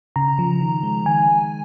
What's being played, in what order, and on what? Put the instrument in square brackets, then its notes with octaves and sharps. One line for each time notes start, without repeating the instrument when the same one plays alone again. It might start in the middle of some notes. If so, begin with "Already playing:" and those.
[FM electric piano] C#3 A#5
F3
D#3
G#3
D#3 G#5
G#3